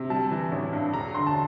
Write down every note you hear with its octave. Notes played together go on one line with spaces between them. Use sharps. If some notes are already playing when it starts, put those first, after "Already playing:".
Already playing: C3
G3 A5
E3
A1
G2
E1 A#5
D3 C6
A5